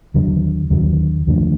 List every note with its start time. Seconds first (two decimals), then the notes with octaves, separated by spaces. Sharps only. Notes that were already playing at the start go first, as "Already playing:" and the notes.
0.14 D#2 D3 F#3
0.70 D#2 D3 F#3
1.27 D#2 D3 F3 A3